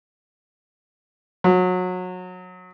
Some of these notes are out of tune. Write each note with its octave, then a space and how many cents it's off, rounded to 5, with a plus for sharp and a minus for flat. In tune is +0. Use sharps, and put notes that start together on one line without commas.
F#3 -25